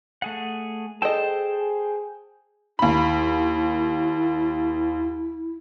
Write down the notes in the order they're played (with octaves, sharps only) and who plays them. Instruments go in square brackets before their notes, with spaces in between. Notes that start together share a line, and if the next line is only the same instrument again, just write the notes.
[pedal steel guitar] A3 G#4 F#5
[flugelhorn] G#4 [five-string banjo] A4 D#5 [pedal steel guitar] C5 G5 A5
[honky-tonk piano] D#2 B5 [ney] E4